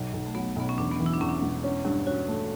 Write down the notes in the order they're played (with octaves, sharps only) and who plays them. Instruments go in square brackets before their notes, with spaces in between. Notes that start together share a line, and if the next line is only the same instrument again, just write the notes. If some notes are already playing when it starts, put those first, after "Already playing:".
Already playing: [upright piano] B1
B1
[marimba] A3
[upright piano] F#3 [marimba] B3
[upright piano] B1 [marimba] B3
[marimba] C#4
[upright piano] E2 [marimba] D4
[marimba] B3
[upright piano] E3
[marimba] E4
D4
[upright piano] E2 [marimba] C#4
[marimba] D4
[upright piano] E1
C#4
G2
[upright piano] C#4 [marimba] F#4
[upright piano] A3